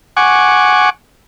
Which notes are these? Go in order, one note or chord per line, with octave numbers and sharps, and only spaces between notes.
F#5 G#5 C#6 D6